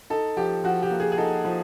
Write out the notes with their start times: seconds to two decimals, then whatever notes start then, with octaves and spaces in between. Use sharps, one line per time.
0.10 D#4 A4
0.37 F3 G4
0.64 F3 F#4
0.83 G4
0.91 A#3
1.00 G#4
1.12 G#4
1.18 D#4 A4
1.45 F3